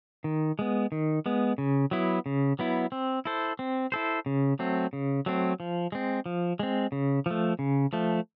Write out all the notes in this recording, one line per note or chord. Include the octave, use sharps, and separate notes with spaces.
D#3
G#3 B3
D#3
G#3 B3
C#3
F#3 B3 E4
C#3
F#3 B3 E4
C4
E4 A4 C5
C4
E4 A4 C5
C#3
F#3 A3 C4
C#3
F#3 A3 C4
F3
G#3 C4
F3
G#3 C4
C#3
F3 A3
C#3
F3 A3